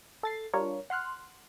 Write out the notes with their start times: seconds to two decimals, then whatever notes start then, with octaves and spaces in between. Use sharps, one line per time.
0.23 A4 A6 C7
0.54 G3 D4 F4 A#4 C#5
0.90 F#5 C6 F6 F#6